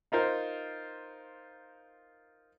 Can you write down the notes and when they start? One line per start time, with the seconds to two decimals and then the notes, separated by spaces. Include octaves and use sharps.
0.12 D#4 F4 A#4 C5